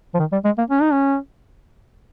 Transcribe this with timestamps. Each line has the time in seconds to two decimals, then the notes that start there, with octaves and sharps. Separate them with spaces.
0.14 F3
0.19 D#3
0.32 G3
0.45 G#3
0.58 A#3
0.70 C#4
0.81 D#4
0.92 C#4